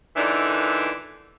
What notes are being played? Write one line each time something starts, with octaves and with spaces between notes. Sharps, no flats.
A#2 D3 E3 D4 D#4